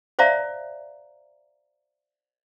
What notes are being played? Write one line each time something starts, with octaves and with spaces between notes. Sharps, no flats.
C5 D5 E5 F5 A#5